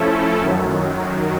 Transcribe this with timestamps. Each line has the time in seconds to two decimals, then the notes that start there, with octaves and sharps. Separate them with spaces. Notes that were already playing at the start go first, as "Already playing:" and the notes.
Already playing: F3 A3 C#4 E4 A4
0.39 F#2 D#3 F#3